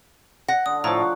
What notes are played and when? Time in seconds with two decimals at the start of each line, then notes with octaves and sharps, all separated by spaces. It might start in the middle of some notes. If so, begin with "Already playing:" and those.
0.48 F#5 A#6
0.66 D3 D#6
0.84 A2 F3 C5 C#5 A#5
0.97 D5 F#5